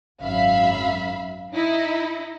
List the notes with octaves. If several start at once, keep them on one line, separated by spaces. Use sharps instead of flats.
G#1 F#2 E5 F5 B5
D#4 E4